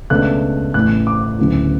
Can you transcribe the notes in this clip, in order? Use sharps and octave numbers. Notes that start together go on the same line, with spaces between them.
C#2 B2 A3 D4 F#6
A1 A2 E3 F#6
D6
D2 C#3 F#3 B3 E4